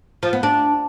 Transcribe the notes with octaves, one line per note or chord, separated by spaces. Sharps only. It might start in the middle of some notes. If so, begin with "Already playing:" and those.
F3
B3
D4